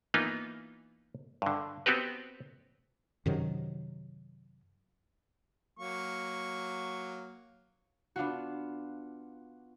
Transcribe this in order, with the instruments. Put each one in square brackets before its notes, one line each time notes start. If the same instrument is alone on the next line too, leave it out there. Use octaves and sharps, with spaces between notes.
[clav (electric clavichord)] E3 A#3 B3 D#4 F4
G2 D3
B3 C4 F#4 G4 B4
[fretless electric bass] F#2 C3 D#3 F#3
[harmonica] F#3 A#3 C#6
[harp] B3 D4 F4 F#4